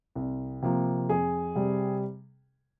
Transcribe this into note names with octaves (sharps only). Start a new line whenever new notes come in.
C2
C3 F3 A#3
F2 G#4
C3 G3